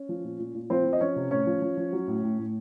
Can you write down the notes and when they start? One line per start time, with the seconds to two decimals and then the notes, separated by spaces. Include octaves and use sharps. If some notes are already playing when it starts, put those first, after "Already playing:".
Already playing: C#4
0.09 F3
0.24 A#2
0.39 A#2
0.55 A#2
0.70 F3 C4 C5
0.85 F3
0.93 D#5
1.00 F3 C#4 C#5
1.16 C3
1.31 A2 C#4 C#5
1.47 F3
1.62 F3
1.77 F3
1.93 F#3
2.07 A2
2.23 A2
2.39 A2